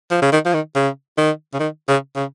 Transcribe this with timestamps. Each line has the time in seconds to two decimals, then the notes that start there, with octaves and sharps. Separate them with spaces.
0.11 F3
0.22 C#3
0.32 D#3
0.45 F3
0.54 D#3
0.75 C#3
1.18 D#3
1.53 C#3
1.59 D#3
1.88 C#3
2.16 C#3